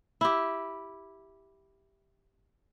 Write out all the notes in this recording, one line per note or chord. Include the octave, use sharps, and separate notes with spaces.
E4 G4